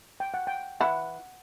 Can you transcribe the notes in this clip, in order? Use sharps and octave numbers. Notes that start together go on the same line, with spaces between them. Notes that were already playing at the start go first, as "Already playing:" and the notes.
G5
F#5
G5
E3 E4 F#5